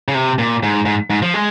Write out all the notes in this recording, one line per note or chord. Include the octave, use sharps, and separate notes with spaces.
C#3
C3
A#2
G#2
G#2
G#2
F3
G#3